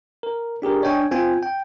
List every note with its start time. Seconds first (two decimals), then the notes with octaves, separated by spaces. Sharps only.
0.23 A#4
0.62 D4 G4 G#4 A#4
0.82 D4 C#5 D#5 G5 G#5
1.11 C4 F4 G5 G#5
1.43 G5